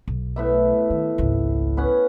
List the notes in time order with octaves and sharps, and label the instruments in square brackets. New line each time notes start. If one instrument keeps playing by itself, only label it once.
[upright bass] B1
[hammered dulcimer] A2 B3 E5
[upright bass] D#3
G#1 C#2
[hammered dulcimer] B3 C#4 F#5